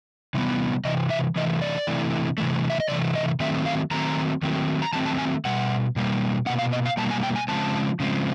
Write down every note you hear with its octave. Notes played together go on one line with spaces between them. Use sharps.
C3 E3 G3 B3
C3 E3 D#5
E5
C3 E3 A3 D#5
D5
C3 E3 A3
C3 E3 A3
E5
D#5
C3 E3 A3 D5
D#5
D#3 F#3 A3 C4 E5
F5
D#3 F#3 A3 C4 A#5
D#3 F#3 A3 C4
A#5
D#3 F#3 A3 C4 A5
A5
G#5
B2 G3 F#5
B2 G3 A#3
B2 G3 A#3 F#5
F5
D#5
F5
B2 G3 A#3 A5
G#5
G5
G#5
C#3 F3 G#3 C4 A5
C#3 F3 G#3 C4